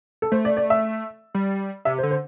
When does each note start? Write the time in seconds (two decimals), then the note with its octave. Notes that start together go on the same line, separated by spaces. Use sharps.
0.22 A4
0.32 A3 C5
0.45 D5
0.57 D5
0.70 E5
1.35 G3
1.85 C3 E5
1.98 C5
2.03 D3
2.11 C5